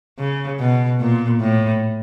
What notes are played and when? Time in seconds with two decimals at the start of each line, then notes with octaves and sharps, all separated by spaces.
0.19 C#3
0.60 B2
1.00 A#2
1.41 A2